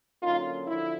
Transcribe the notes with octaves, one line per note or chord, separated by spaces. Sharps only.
D3 F#3 A#3 C#4 D#4 F4
D3 F3 E4